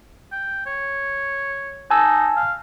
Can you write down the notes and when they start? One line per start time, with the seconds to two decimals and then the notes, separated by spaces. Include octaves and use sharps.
0.32 G5
0.66 C#5
1.91 D#4 G#5 A5 E6
2.37 F5